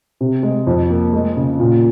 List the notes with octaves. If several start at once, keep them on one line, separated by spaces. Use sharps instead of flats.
C3
G#3
F2
A#3
G#3
C#3
A#2